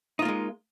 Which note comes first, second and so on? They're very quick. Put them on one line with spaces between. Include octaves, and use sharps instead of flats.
D#4 F4 A#3 G#3